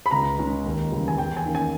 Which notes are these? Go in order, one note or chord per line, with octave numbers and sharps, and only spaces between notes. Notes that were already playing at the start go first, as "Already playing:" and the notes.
B5
C#2 A#5
C#3 G#3 C#4
D#2
C#3 E3 G3
G#5
E2 G5
G#5
D#3 A#3 C#4
G#5